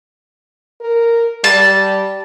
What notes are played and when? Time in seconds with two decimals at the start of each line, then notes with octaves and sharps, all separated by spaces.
0.81 A#4
1.44 G3 A5